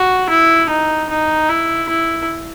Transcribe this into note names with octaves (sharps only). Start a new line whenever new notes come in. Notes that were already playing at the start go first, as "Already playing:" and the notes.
Already playing: F#4
E4
D#4
D#4
E4
E4